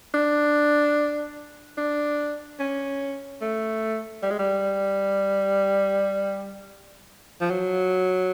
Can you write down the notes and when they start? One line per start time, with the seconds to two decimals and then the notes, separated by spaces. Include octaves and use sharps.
0.14 D4
1.77 D4
2.60 C#4
3.41 A3
4.23 G3
4.31 G#3
4.39 G3
7.41 F3
7.50 F#3